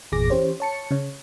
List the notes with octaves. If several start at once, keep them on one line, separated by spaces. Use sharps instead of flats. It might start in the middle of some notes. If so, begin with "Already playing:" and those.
G1 E2 A#2 G#4 D6 A#6
E3 C#4 G4 C5 C#5
C#5 A5 C#7
C#3 C#5